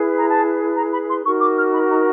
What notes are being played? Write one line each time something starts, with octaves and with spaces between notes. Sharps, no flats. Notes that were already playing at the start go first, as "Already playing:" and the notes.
Already playing: E4 G#4 B4
A#5
A5
A#5
B5
C6
D#4 F#4 A#4 C#6
D6
F6
B5
A#5